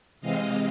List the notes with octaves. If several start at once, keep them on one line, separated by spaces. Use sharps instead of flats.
C3 E3 G#3 C4 D#5 F5